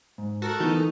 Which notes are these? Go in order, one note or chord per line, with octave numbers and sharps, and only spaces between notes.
G#2
F#4 A4 A#4 A5
E3 A3 B3 D#4